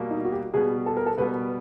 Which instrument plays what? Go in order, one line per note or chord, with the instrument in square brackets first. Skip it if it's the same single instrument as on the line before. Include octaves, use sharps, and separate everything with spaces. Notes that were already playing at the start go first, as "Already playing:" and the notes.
Already playing: [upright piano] B2 G3 A#3
[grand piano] D#4
F#4
G4
[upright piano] B2 G3 B3 [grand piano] G#4
[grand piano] A4
A#4
A4
[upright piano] B2 G3 B3 [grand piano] B4